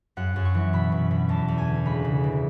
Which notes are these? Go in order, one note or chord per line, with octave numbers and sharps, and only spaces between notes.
F#2 F#5
F#2
C#6
E3
B2 B5
B2
B2
E2 A5
E2
G#5
D3
C#2 B5
C#3
E3